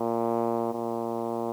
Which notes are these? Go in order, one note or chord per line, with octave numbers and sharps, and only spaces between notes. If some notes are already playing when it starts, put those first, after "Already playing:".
Already playing: A#2
A#2